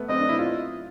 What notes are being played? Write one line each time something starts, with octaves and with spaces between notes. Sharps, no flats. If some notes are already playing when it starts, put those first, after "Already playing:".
Already playing: A3 B3
C4 D#5
D4
E4
F4